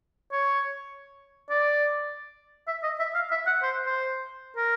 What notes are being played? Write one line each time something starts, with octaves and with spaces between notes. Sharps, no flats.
C#5
D5
E5
D#5
E5
F5
E5
F#5
C5
C5
A#4